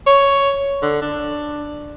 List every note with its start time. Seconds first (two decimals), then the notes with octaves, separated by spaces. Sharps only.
0.07 C#5
0.82 D3
1.02 D4